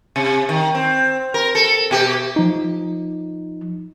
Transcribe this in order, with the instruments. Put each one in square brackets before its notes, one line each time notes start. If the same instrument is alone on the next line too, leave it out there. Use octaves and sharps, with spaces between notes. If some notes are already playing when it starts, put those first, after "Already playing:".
[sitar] C3
D#3
C4
A#4
A4
B2 G4
[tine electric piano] F3 D#4